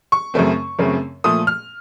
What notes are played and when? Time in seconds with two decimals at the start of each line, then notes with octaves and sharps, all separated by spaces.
0.12 C#6
0.34 F#2 C#3 A3 C4
0.79 F#2 C#3 A3 C4
1.24 A#2 F3 A3 D#6
1.47 F6